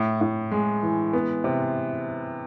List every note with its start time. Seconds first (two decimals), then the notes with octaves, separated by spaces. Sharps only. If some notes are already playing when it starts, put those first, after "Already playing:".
Already playing: A2
0.21 A2
0.51 G#3
0.83 E3
1.13 B3
1.44 C3